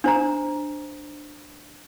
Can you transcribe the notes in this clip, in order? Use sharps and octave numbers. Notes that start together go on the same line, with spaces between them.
D4 C5 A#5